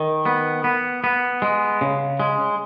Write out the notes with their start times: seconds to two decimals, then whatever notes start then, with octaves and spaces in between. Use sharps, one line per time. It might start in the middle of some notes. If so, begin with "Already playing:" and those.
Already playing: D#3
0.26 B3
0.64 B3
1.04 B3
1.42 G#3
1.81 C#3
2.20 G#3